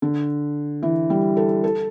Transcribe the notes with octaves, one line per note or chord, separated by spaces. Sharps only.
D3
E3
G3
A4
A4